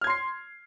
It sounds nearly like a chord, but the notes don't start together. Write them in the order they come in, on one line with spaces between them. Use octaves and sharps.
F6 G#6 C6 C7